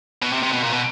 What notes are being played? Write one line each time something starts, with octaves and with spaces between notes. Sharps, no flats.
B2
C3
C3
B2
A#2
B2